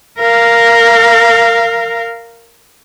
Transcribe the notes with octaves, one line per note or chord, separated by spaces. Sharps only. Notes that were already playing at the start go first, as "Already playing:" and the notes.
A#4 F5